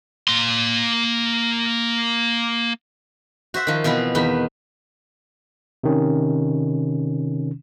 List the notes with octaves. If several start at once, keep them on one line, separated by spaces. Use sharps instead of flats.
A#3 C6
F#4 C5 E5 F#5
D#3 F3
B2 E3 F3 B3 C4
E2 D#3 B3
C3 D#3 C#4